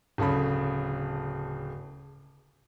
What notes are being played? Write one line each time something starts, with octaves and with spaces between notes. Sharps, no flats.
D1 C#3 A4 B5